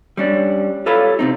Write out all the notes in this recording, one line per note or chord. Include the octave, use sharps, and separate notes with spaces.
G3 C#4 D4
F4 G4 A4 B4 C#5 F5
C3 C4 D#4